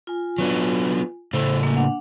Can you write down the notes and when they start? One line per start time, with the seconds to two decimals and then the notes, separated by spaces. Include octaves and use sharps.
0.07 F4 G#5
0.38 F#3 B3 D4
1.33 A2 C#3 A4 C5
1.63 A#3 G#5
1.76 D4 F#5